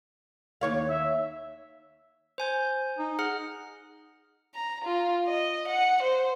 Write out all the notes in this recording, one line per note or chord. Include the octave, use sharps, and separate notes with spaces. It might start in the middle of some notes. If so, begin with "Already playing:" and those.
D#2 C#5 F5
E5
C5 G#5 G6
D#4
G#4 F#5 F6
A#5
F4
D#5
F#5
C5